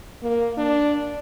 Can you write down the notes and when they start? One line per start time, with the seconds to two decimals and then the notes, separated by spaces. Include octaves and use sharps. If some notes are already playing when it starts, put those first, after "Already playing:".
0.22 A#3
0.57 D4